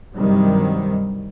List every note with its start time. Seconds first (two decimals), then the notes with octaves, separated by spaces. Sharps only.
0.15 G2 C3 D#3 F#3 G3